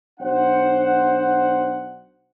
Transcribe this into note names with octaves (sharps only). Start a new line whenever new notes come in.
B1 D4 C5 F#5